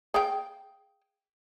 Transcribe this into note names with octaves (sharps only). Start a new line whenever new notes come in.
G#4 F5 G5